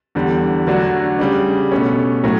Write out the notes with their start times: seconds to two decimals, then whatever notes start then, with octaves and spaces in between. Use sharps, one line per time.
0.15 E2 D3 G3
0.67 D3 F#3 A3 D4 F#4
1.19 C#3 G3 D4
1.72 B2 A3 C#4
2.24 A2 F#3 A3